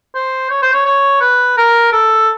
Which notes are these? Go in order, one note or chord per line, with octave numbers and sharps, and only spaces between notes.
C5
C#5
C5
C#5
C#5
B4
A#4
A4